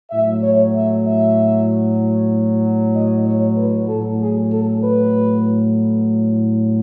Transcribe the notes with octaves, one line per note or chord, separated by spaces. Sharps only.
A2 F#3 E5
C#5
E5
E5
D#5
C#5
B4
A2 F#3 A4
G#4
A4
B4